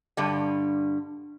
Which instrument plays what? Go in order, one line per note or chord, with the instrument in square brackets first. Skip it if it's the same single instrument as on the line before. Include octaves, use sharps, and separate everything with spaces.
[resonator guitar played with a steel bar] G2 D3 G3